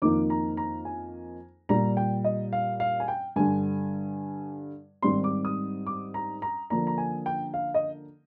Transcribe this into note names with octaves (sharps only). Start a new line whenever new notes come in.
F2 D#3 A#3 D#4 D6
A#5
A#5
G#5
A#2 G3 A#3 A#5
G5
D#5
F5
F5
G#5
G5
G2 D3 G3 G#5
G#2 D#3 G3 C4 C6
D6
D#6
D6
A#5
A#5
D3 F3 A#3 D4 A#5
A#5
G#5
G5
F5
D#5